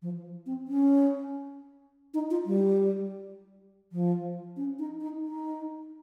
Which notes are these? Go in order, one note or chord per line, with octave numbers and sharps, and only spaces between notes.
F3
C4
C#4
D#4
F4
G3
F3
C#4
D#4
D#4
D#4